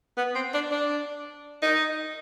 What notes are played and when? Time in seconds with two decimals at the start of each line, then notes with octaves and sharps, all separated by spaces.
0.17 B3
0.35 C4
0.54 D4
0.71 D4
1.62 D#4